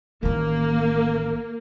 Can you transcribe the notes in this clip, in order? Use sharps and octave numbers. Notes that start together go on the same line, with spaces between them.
A1 D#3 A#3